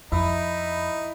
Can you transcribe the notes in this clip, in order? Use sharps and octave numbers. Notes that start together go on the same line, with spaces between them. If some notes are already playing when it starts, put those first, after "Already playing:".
F2 D#4 E4